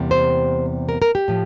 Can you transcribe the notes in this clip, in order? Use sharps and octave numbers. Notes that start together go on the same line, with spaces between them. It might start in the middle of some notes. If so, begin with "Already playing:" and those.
Already playing: E2 C3 G3 A#3
C5
A#4
A#4
G4
A2 F3